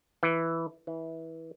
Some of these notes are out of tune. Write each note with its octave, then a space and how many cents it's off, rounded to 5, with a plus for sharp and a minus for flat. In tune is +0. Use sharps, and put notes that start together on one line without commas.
E3 +0
E3 -20